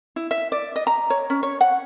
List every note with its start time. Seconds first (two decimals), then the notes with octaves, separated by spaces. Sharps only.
0.16 E4
0.31 E5
0.52 D5
0.76 D#5
0.87 A#5
1.10 C#5
1.30 C#4
1.43 C#5
1.61 F#5